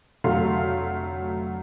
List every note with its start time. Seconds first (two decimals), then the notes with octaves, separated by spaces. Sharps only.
0.24 F1 D3 F#3 A3 F5 C6